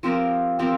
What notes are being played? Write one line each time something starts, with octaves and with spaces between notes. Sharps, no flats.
F3 C4 G4 A#4
F3 C4 G4 A#4